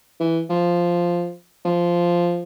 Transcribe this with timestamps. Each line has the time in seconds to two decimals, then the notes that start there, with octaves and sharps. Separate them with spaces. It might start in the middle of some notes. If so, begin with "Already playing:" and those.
0.20 E3
0.50 F3
1.65 F3